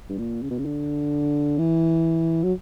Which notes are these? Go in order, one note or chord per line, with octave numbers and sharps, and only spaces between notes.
G2
A#2
C#3
B2
C#3
D3
E3
F#3